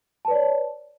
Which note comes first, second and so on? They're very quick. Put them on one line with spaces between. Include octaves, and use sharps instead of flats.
A5 B4 D5 C#5